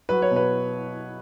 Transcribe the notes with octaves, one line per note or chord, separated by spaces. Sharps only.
F#3 B4
C#5
B2
B4